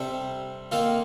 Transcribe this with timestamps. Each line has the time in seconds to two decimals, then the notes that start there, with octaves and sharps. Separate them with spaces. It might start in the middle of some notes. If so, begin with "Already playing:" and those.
Already playing: C3 G3 D4 A4
0.72 D#3 A#3 F4 A4